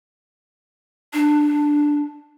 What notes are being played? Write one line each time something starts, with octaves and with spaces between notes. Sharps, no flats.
D4